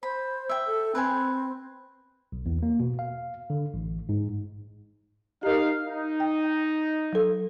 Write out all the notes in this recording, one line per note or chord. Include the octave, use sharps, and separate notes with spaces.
C5 B5
E5 G5
A4
C4 B4 G5 G#5
B1
E2
A#3
B2
F5
D3
A1
G#2
D#4 G4 A#4 F5
D#4
G5
F#3 A4